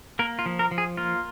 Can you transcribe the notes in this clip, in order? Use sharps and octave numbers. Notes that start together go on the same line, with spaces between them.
A#3 A#4
F4
F3
A#4
F3
G#4
A#3 F4